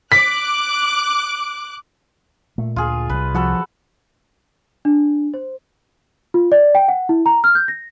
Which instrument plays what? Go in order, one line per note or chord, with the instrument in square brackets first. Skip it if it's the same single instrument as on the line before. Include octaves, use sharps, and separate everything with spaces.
[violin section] D6 F#6 [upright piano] B6
[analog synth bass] A#2 [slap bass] A3
[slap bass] D2 [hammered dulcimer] F4 G#4
[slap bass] C2 G3 [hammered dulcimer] B4
[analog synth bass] F3 [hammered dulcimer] F#4 A4 B4
[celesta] D4
C5
F4
D5
G5
F#5
E4
A#5
F6
G6
A#6